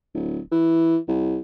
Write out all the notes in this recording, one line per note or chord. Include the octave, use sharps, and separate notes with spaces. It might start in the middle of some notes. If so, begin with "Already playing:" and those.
D1
E3
C2